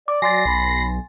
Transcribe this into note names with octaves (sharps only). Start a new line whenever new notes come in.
D5 D6
F#3 D5 G#5 C6 A6 A#6 C7
B1 B5